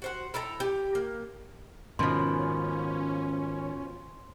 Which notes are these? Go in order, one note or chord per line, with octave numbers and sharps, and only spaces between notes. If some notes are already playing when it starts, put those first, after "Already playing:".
F#4 C5 F#5
E4 A4 G5 A#5
G4
A#3
G#2 B2 D#3 F3 C#4 C6